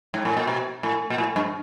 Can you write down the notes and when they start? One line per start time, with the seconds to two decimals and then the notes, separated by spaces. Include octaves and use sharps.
0.14 G#2
0.25 A2
0.37 A#2
0.47 B2
0.83 A2
1.10 A#2
1.18 A2
1.36 G2